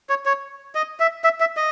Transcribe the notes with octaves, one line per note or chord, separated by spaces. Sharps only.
C#5
C#5
D#5
E5
E5
E5
D#5